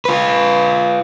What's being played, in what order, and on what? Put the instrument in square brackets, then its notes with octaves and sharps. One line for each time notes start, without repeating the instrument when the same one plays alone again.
[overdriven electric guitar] F4 B4